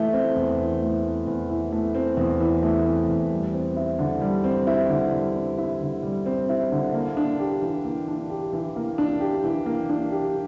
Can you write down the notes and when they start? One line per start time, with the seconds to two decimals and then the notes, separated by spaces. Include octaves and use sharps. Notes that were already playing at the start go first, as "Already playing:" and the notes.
Already playing: E3 A3
0.13 C4
0.36 E2
0.59 E3
0.82 A3
1.04 C4
1.27 E2
1.50 E3
1.72 A3
1.95 C4
2.17 E2
2.40 E3
2.62 A3
2.86 C4
3.09 E2
3.31 G3
3.54 C4
3.76 E4
3.99 D3
4.21 G3
4.44 C4
4.67 E4
4.89 D3
5.13 G3
5.35 C4
5.58 E4
5.81 D3
6.03 G3
6.26 C4
6.49 E4
6.72 D3
6.94 A#3
7.17 D4
7.40 G4
7.62 E3
7.84 A#3
8.08 D4
8.30 G4
8.53 E3
8.76 A#3
8.98 D4
9.21 G4
9.44 E3
9.66 A#3
9.89 D4
10.12 G4